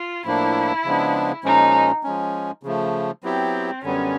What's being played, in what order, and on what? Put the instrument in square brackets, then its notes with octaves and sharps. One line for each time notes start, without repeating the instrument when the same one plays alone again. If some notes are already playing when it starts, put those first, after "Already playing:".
Already playing: [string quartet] F4
[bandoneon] A2 F3 A#3 D4 [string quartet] E4
[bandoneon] C#3 F3 G#3 B3 D4
[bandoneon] A#2 F3 G#3 C#4 [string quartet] D#4
[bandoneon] F3 G#3 C#4
C#3 F3 A3
[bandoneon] F#3 B3 E4 G4 [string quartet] C4
[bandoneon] F#2 D3 G3 B3 [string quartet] C#4